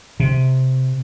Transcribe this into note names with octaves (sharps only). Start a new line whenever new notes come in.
C3